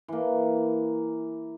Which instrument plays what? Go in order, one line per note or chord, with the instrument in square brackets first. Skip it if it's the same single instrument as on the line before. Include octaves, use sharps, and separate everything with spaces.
[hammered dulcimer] E3 A#3